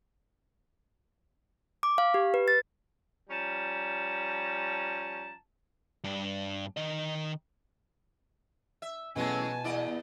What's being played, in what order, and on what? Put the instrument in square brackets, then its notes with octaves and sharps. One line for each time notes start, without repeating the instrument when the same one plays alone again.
[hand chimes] D6
F5
G4
B4
A6
[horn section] F3 G3 C#4 A5 A#5
[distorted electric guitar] G2 D4
D#3 D#5
[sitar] E5
[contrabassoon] A1 [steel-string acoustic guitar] B2 [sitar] F#3 G#3 A3 [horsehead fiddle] G#5 A5
[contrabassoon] E2 [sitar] A#2 D5 D#5